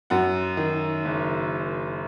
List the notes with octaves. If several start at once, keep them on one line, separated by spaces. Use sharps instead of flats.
F#2 F#5
D#3
F#1